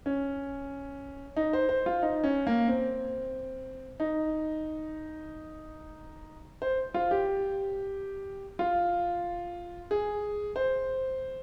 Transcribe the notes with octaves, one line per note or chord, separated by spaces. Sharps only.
C#4
D#4
C5
C5
F4
D#4
C#4
A#3
C4
D#4
C5
F4
G4
F4
G#4
C5